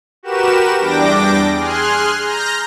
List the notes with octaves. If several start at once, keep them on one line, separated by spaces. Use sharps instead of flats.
F#4 G4 A#4 B4 E7
E2 G3 D4 G5 D6 A#6
G#4 G#5 C6 F6 F#6
A#5 F6 G6 A#6